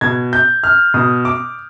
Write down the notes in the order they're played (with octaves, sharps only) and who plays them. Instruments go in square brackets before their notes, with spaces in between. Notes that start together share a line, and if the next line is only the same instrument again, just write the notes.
[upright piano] B2 G#6
G6
F6
B2 D#6
D6